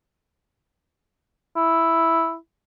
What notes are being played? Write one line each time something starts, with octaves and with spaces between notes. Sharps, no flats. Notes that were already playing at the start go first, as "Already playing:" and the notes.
E4